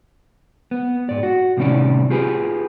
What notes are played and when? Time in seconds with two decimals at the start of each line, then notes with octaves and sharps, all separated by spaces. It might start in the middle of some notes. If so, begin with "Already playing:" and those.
0.71 B3
1.09 G#2 D5
1.23 F#4
1.57 C2 A2 C3 D#3 C#4 D5
2.10 F4 G4 G#4 B4